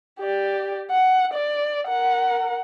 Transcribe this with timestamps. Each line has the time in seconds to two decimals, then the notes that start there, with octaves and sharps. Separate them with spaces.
0.20 G4 D5
0.91 F#5
1.33 D5
1.88 A#4 F#5